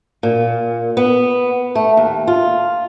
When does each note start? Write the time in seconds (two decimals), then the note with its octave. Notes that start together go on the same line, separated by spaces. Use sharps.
0.23 A#2
0.97 B3
1.75 A3
1.97 D#2
2.27 F4